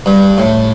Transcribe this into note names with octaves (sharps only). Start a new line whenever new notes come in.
G2
A2